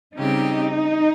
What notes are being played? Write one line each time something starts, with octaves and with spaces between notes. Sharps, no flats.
C#3 G3 C4 D#4 G4